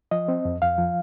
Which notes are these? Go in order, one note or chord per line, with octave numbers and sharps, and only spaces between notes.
F3 D#5
C4
F2
F2 F5
F3